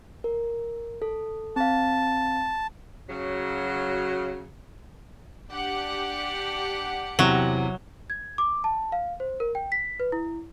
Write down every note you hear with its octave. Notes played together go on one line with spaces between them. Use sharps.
A#4
A4
C4 F5 A5
C#3 F#3
D4 G4 F#5
E2 C3 F#3
G#6
D6
A5
F5
C5
A#4
G5
B6
B4
E4